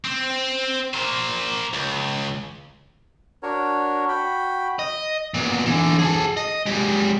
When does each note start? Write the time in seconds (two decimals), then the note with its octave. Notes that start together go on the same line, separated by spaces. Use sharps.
0.05 C4
0.94 A#3 C5
1.74 C#2
3.43 D4 F#4 A#4 C#5
4.08 F#4 G5 B5
4.79 D#5
5.34 A#2 B3
5.66 D3 E3
5.99 G#4 A4
6.37 D#5
6.66 G#3 G4